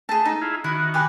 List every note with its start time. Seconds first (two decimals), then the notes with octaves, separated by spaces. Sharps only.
0.09 A3 G#4 A5
0.25 D#4
0.42 E4 F4 G#4
0.64 D#3 E4 F#4
0.94 G4 B4 G#5